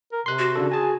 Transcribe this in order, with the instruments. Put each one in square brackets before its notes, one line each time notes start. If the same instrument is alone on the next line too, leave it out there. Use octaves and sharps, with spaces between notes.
[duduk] A#4
[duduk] C3 [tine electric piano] C6 F#6
[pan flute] F#4
[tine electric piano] C#3 D4 A4
[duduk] G#4 [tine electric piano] G#5 A5